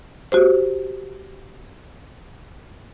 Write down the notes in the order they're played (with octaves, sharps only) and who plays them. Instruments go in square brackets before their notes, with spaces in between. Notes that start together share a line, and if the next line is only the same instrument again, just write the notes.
[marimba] F#4 G4 C5